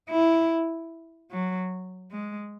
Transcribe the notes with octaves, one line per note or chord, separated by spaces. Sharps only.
E4
F#3
G#3